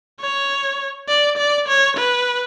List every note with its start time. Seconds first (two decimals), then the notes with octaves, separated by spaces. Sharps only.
0.21 C#5
1.09 D5
1.38 D5
1.68 C#5
1.97 B4